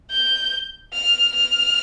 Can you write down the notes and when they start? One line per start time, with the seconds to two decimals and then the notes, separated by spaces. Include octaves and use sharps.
0.11 G6
0.94 F6
1.36 F6